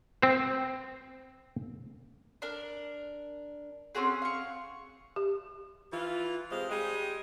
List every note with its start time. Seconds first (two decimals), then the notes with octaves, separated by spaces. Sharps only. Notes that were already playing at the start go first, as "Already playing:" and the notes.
0.22 C4 C5
2.42 D4 A#4
3.95 C4 C#4 F#4 G#4
4.22 F5 C#6
5.16 G4
5.91 E3 F4
6.50 C3 G#3 C5 F5
6.70 G3 G#3 G4 G#4